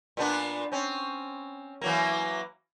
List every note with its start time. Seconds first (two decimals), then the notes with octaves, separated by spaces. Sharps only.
0.17 A#2 B3 D4
0.72 C4 C#4
1.81 E3 F#3 A#3